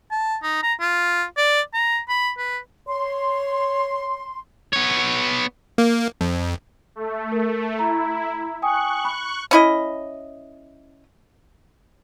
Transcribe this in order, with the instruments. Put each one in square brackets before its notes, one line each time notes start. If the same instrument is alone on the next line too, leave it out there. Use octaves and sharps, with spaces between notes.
[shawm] A5
D#4
A#5
F4
D5
A#5
B5
B4
[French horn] C#5 [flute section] C6
[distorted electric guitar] B3 C#5
[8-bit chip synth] A#3
F2
[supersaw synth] A3
[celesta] A#4
[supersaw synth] E4 [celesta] A#5
[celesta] G5 G#5 D#6 [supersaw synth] C#6 F#6
[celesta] B5
[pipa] C#4 E4 D#5